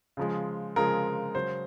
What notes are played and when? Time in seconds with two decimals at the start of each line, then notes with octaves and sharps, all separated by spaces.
0.17 C#3 F3 G#3
0.76 C#3 F3 G#3 A#4
1.35 C#3 F#3 C5